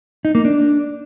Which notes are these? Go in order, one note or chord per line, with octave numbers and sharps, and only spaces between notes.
D#4
A#3
D4